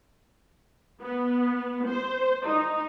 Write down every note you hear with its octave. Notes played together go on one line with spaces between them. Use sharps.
B3
C5
D#4